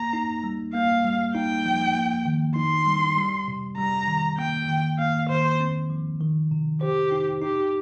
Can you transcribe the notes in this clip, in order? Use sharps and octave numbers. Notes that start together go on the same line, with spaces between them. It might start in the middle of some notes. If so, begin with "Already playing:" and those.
Already playing: A#3 A#5
D#4
G3
A#3 F5
G3
D#4 G5
F3
A#3
D#3
D#4 C6
G3
G3
C3
G3 A#5
D#3
A#3 G5
D#3
A#3 F5
D#3 C5
C4
F3
D#3
C3
G4 C5
D#4
D#4 G4